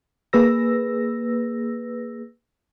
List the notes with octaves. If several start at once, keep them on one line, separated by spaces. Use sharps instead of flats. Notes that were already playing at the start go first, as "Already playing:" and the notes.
A#3 G#4 B4 E6 A#6